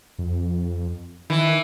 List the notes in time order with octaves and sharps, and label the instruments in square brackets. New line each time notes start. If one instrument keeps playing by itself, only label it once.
[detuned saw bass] F2
[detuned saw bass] D#3 [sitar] E3